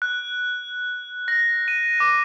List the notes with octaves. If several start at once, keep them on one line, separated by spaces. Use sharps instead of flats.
F#6
A#6
D#7
D6